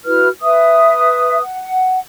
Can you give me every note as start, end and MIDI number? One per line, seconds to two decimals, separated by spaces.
0.05 0.28 64
0.05 0.28 66
0.05 0.28 71
0.05 0.28 89
0.41 1.41 71
0.41 1.41 76
0.41 1.41 87
1.41 1.98 78